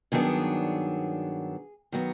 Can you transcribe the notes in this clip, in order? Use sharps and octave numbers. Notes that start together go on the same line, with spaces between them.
G2 D#3 F#3 B3 D4 G#4
D#3 F#3 B3